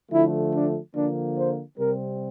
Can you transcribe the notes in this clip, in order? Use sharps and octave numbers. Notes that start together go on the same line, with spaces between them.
D3 F3 A3 E4
D4
D3 F3 A#3 D4
C5
C3 G3 C4 A#4